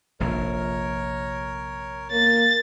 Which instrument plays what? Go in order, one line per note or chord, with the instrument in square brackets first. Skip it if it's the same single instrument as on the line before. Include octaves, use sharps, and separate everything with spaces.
[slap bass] F1 A#1 F2 [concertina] A#4 C#5
[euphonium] A#3 [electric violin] A6